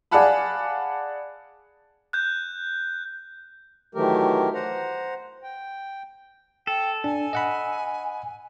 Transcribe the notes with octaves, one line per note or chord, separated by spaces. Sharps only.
G#4 D5 F5 F#5 A5 B5
F#6 G6
D#3 E3 F#3 A3 G4 A#4
C5 F#5 A#5
G5
A4 G5
D4 G#5
D#5 F#5 B5